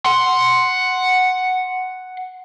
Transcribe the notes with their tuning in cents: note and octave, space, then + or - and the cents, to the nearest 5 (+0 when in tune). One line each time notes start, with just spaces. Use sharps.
F#5 +0 C6 +0